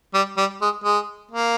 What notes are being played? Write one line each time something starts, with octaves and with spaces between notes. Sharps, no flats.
G3
G3
G#3
G#3
A#3